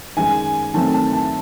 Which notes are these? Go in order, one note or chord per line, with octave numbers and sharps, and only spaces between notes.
F#2 D#3 G#3 G#5
D#3 F#3 A3 C4 A5
A5
A5